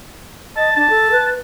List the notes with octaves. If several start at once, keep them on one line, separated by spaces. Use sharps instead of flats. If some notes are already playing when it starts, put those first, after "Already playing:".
D#5 A5
D4 A5
A4
B4